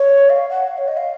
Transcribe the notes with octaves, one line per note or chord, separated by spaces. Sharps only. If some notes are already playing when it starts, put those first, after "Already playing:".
Already playing: C#5
F5
F#5
F5
C#5
D#5
F5